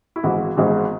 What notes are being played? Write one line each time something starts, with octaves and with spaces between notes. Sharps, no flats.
E4
G#1 G#2 E3 G#3 B3 F#4
G#1 G#2 E3 G#3 B3